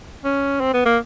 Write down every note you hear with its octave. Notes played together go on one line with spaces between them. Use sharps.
C#4
C4
B3
A#3